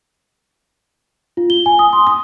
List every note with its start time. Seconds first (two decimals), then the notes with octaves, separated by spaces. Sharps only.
1.37 F4
1.50 G7
1.66 G#5
1.79 D#6
1.93 C6
2.07 D#6